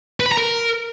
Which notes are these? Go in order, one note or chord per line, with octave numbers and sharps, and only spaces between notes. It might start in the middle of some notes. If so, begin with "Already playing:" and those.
B4
B5
A#5
A#4